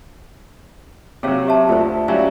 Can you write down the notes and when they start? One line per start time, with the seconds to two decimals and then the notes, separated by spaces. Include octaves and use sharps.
1.23 C3 F#3 G#4 C#5 F5
1.47 G4 E5 A5
1.69 D2 E4 F4 A4 C5
2.08 F#3 G3 C#4 E4 F5 G#5